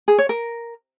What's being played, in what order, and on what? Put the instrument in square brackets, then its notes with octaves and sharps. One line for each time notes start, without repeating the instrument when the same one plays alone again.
[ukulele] G#4
C#5
A#4